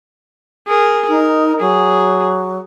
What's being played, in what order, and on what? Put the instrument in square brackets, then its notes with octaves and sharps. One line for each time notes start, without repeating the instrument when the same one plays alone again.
[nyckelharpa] G#4 A#4
[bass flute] D#4 [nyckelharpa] A#4
[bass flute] F#3 [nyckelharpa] G#4